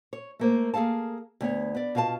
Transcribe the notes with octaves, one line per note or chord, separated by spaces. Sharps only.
C#5
A3 A#3 C5
A#3 G#4 A4 F5 A5
D2 B3 C#5
B3 D5
B2 F4 F5 G#5 A5